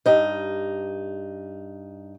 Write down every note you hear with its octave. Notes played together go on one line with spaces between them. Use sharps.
G2 D#4